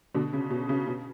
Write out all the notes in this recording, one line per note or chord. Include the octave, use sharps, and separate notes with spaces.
B2 D3
C#3
B2
C#3
B2